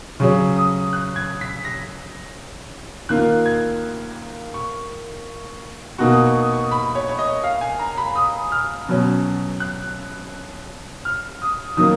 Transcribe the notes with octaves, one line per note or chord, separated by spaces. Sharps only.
C#3 F#3 C#4 C#6
D#6
F#6
G#6
B6
A#6
D#3 A#3 F4 F#6
G#6
C#6
B2 A#3 D#4 F#4 C#6
D#6
C#6
D#6
C#6
B5
C#5
C#5
D#5
F5
G#5
A#5
B5
D#6
F6
B2 F#3 C#4
F#6
F6
D#6
D#3 F#3 A#3 D#6